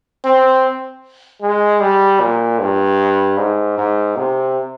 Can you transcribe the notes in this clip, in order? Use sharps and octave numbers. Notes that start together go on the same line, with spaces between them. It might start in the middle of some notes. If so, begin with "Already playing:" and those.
C4
G#3
G3
A#2
G2
G#2
G#2
C3